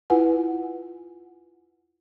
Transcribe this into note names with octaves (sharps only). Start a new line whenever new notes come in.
E4 F4 B4 F#5 G#5